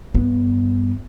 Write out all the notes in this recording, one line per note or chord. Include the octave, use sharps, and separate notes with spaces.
G2 B3